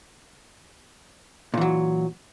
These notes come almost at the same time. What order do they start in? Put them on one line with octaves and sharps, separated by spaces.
A#2 E3 F#3